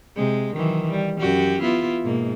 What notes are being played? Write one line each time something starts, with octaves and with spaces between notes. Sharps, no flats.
C3 G#3
D#3 E3 F#3
G3
F#2 F#4 G4
B3 E4 F4
G#2 B2 A#3